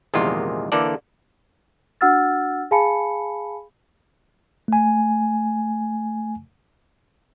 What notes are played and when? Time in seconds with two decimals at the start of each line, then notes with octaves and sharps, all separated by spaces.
0.14 A#1 E2 C3 D#3 G#3 F4
0.72 D3 E3 A#3 A4 D5
2.01 D4 F#4 F#5 E6 F6 A6
2.71 G#4 F5 G#5 A5 B5 C#7
4.68 A3 G#5